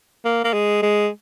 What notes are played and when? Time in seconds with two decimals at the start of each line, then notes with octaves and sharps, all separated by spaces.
0.25 A#3
0.44 A#3
0.53 G#3
0.82 G#3